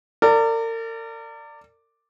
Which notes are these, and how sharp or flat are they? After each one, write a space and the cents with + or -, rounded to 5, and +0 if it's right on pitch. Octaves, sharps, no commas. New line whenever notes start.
A#4 -40 D5 +0